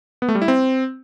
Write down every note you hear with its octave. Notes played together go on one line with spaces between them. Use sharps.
B3
A3
G3
E4
C4